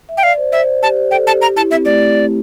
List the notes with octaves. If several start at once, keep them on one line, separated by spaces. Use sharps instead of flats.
E5
G5
D5 F5
C5
C5 E5
G4 A5
C5
A4 G5
G4 A5
G4 A#5
E4 A5
C4 E5
A3 D5